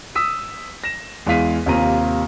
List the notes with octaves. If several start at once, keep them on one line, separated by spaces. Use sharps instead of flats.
D#6 E6 B6 D#7
A#6 E7
E2 G#3 E4 F5 B6 D#7
D#2 C3 A#3 F4 A#5 D#7